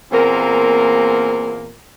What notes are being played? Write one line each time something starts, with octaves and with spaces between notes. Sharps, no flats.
E2 A#2 A#3 C4 A#4